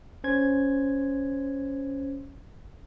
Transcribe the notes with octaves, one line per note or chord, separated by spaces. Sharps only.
C#4 C5 G#6